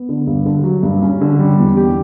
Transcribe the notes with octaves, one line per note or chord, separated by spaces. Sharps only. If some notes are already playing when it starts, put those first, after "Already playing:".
Already playing: B3
D3
G2
D3
F#3
G2
C#4
D3
G3
E2
G4